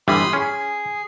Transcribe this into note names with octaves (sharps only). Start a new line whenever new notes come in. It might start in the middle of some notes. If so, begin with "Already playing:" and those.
G1 E3 G3 B5 C6 D#6
C#4 G#4